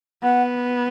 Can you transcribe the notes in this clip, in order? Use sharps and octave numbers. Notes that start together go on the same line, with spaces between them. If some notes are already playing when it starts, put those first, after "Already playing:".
B3 F#5